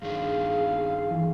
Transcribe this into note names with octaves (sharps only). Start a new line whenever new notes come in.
G2 D#3 D4 G#4 F5
E3